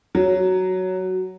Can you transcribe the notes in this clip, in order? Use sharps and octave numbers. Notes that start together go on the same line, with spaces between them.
F#3